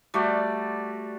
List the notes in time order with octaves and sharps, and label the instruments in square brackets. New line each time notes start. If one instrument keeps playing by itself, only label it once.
[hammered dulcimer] G3 A3 F#4 D5